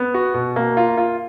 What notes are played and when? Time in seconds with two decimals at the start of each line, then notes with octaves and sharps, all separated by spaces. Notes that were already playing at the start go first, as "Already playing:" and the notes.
Already playing: B3
0.14 F#4
0.34 B2
0.56 A#3
0.77 F4
0.98 F4